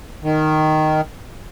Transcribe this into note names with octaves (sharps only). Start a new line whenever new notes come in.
D#3